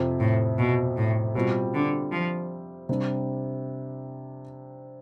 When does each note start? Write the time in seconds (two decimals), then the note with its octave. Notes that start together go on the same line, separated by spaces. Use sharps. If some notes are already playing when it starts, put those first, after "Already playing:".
Already playing: F2 C3 F3
0.20 A2
0.59 B2
0.97 A2
1.35 B2 G3 C4 F4
1.74 D3
2.12 F3
2.89 C3 G3 D4